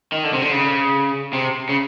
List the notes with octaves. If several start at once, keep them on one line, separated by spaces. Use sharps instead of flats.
D#3
D3
C3
D3
C#3
C3
C#3